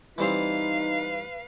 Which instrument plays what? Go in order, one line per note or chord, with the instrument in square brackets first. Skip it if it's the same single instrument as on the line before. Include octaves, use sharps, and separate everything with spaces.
[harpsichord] E3 G3 C4 [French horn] D#4 [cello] B4 F5